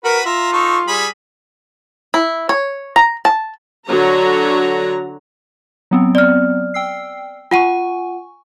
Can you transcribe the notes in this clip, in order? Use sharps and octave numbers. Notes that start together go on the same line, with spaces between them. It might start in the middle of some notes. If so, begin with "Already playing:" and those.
F#4 A#4 B4 B5
F4 E5 A#5
D#4 A4 C#6
G3 G#4 B5
E4
C#5
A#5
A5
D3 F#3 F#4 C#5 A#5
F#3 B3 C4
D5 F6
G5 E6 C7
F4 F#5 G#5 C#6 D#7